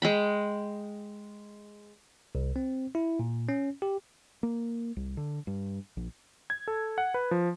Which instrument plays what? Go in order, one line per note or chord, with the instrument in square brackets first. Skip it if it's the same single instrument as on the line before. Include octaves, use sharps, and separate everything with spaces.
[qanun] G#3 G5 B5
[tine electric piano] C2
C4
E4
A#2
C#4
G4
[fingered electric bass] A#3
C2
D3
G2
A#1
[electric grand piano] G#6
A4
F#5
B4
F3